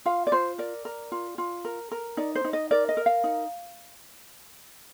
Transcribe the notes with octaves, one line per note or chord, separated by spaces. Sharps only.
F4 F5
D5
F4 C5
A#4 D5
A#4
F4
F4
A#4
A#4
D#4 D5
C5
D#4
D#5
A#4 D5
D#5
A#4
F5
D#4